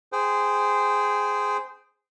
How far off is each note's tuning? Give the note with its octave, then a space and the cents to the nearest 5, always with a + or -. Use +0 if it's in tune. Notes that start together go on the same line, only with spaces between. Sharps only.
G#4 -5 C5 -20 G5 +0